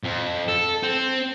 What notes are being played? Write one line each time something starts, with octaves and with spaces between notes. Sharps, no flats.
F2
A4
C4